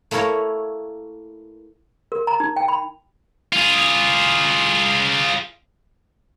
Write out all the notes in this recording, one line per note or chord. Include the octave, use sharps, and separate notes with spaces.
A3 A#3 E4 A#4 C#5
A#4
A#5
D#4
G5
B5
F4 G#4